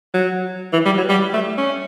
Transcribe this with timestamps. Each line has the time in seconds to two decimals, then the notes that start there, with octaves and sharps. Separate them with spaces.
0.14 F#3
0.73 E3
0.85 G3
0.97 F#3
1.09 G3
1.33 A3
1.57 C#4